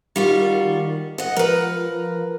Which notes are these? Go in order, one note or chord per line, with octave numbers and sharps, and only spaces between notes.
D#3 G3 F4 F#4
D#5 F#5
F3 A#4 B4